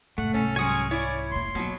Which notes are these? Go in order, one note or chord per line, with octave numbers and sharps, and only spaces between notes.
F1 G#2 A3 F#5
C2 G#2 C#4 A4
F#3 G#3 C#4 G#5 C#6 D#6
E4 C#5 D5
E1 A#3 C6
B2 F#3 A#3